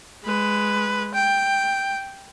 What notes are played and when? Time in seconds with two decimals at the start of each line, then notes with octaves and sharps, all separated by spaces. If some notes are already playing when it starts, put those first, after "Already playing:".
0.25 G#3 B4
1.14 G5